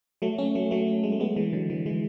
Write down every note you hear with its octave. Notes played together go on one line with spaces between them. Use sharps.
F#3 A3
A3 C#4
F#3 A3
F#3 A3
G#3
A3
G#3 B3
E3 G#3
D3 F#3
E3 G#3
E3 G#3